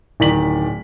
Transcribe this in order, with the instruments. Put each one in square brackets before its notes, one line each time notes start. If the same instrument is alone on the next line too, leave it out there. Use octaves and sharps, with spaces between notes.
[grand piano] D1 D#3 D5 B6 F#7